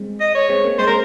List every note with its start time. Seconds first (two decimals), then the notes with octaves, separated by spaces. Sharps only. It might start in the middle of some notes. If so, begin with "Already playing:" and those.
Already playing: G#3 C4
0.20 D#5
0.35 C#5
0.49 G#3 C4
0.64 A#3 C#4
0.79 G#3 C4 C5
0.87 A#4